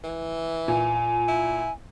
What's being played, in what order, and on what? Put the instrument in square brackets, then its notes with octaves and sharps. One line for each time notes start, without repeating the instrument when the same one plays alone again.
[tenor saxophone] E3
[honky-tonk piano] A#2 [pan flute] G#5
[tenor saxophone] E4